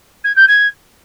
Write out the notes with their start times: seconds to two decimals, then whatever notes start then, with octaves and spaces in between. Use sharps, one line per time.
0.24 G#6
0.36 G6
0.48 G#6